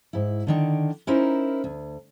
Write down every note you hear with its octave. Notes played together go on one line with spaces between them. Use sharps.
G#2 E4
D3 D#3 D4
C#4 D#4 E4 A#4 C5
D2